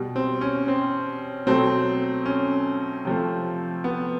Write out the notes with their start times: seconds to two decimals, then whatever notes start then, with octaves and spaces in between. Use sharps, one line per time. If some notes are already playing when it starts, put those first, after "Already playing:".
Already playing: B2 G3
0.16 C4
0.41 C#4
0.68 C4
1.47 B2 F#3 A3 C4
2.25 C#4
3.05 C3 F3 A3
3.84 B3